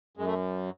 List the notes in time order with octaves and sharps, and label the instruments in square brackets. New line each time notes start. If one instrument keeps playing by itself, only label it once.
[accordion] F#2 G#3
A3